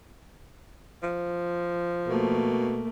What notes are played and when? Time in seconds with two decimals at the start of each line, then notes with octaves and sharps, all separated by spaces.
1.03 F3
2.08 B2 A3 A#3